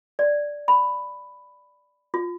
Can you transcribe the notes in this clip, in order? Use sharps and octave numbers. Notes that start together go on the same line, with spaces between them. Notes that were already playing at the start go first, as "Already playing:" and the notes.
D5
B5
F4